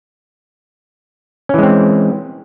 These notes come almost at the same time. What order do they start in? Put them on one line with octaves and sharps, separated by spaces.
C#4 E3 G#3 C4